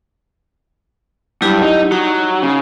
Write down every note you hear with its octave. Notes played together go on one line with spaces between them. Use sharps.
G2 F#3 E4 G4
D#4
F#3 D#4
C#3